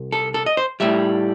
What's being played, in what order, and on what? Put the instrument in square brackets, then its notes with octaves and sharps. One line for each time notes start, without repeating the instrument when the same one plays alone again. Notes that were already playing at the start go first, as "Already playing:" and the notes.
Already playing: [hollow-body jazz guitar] C2
A4
A4
D#5
C5
A2 G3 E5